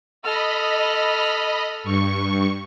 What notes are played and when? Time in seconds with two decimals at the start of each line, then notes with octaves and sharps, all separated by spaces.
0.24 A4 D#5 B5 F6
1.84 G2 C#6